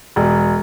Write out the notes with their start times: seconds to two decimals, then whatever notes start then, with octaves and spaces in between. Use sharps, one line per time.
0.16 E1